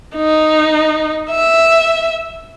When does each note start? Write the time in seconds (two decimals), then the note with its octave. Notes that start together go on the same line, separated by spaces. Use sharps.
0.16 D#4
1.30 E5